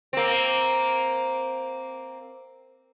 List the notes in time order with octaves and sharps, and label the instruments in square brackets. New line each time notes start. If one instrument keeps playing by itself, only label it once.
[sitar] A#3 C4